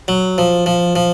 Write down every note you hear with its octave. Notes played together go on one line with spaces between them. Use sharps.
F#3
F3
F3
F3